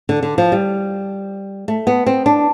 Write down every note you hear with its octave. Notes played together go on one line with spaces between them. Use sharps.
D3
D3
F3
G3
A3
B3
C4
D4